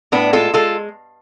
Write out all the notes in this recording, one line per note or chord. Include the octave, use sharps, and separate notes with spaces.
A2 B3 D4
G#3 F4 A4
G#3 F4 A4